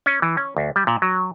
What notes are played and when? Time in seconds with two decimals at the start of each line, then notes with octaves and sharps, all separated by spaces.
0.06 C#4
0.22 E3
0.37 C#4
0.57 D2
0.76 G3
0.87 A#2
1.02 F#3